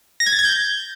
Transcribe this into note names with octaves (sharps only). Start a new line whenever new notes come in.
A#6
G#6
A6
G#6
G6